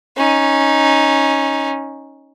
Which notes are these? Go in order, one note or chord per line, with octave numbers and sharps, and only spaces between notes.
C#4 D#4